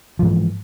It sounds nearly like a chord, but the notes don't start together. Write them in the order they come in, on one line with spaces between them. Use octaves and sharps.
F3 G#2 E3